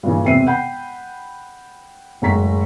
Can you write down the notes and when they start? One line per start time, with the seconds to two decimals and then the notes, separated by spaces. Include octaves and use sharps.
0.03 G2 A#2 C#3 E3
0.25 E1 C3 B4 E5 C7 D#7
0.46 F#5 G5 B5 G6
2.22 F#1 A2 G#3 A#5 C#6 B6